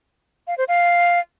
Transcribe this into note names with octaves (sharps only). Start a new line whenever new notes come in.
F5
C5
F5